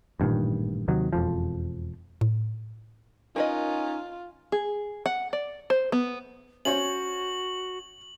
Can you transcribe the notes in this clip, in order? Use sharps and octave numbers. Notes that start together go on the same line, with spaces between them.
A1 G2 A#2 D#3
D#2 C3 D#3 F#3
E1 F2 F3
A2
C#4 D#4 F4 A#4 B4 D#5
G#4
F#5
D5
C5
B3
C#4 F#4 C5 C#5 F#7